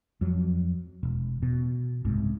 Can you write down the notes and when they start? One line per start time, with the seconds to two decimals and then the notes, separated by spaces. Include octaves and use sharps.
0.21 F2 F#3
1.03 E1
1.42 B2
2.05 F#1 C2 G#2